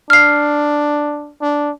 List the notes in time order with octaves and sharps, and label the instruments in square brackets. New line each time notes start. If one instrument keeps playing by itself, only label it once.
[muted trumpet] D4 [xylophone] F6 C7
[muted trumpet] D4